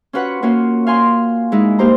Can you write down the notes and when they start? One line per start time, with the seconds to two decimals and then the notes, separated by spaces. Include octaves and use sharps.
0.13 C#4 F4 F#4 B4 F#5
0.42 A#3 C#4 F4 F#4 F5
0.87 F5 G#5 C6
1.52 G#3 D#4 E4
1.79 A#3 D#4 G4 C5 A#5